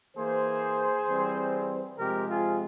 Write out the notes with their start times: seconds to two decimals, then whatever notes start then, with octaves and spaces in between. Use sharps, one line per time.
0.16 E3 A#3 G#4 C5
1.08 E3 G3 C4
1.98 C3 F3 G#3 C4 G4 A#4
2.29 F4 G#4